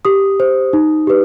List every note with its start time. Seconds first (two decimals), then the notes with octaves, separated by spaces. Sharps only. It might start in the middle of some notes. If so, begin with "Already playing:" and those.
0.05 G4 D#6
0.40 C5
0.73 D#4
1.07 G4 B4